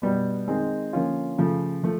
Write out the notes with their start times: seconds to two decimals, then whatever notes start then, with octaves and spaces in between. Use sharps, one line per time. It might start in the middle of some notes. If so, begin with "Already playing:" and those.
0.02 B2 G3 B3
0.47 D#3 G#3 C4
0.93 D3 F3 A#3 C#4 F4
1.38 C#3 F3 A3
1.83 F3 A3